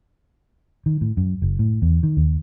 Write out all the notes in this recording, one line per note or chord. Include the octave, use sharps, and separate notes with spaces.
D#3
A2
F#2
F#1
A2
E2
D#3
D#2